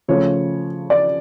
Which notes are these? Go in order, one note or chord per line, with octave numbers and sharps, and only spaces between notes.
C#3 F3 A3 C#5
D5